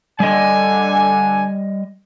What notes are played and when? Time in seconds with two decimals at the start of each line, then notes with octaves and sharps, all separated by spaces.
0.20 D3 G3 D#5 G#5